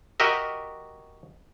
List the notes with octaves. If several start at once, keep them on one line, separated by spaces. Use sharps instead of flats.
F#4 G4 A#4 D#5 E5